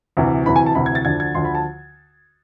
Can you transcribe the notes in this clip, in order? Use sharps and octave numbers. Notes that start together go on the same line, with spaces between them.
D2 C3 E3
D2 C3 E3 B5
G#5
A5
D2 C3 E3 B5
G#6
A6
D2 D3 F3 G#6
G#6
D2 D3 F3 C6
B5
A5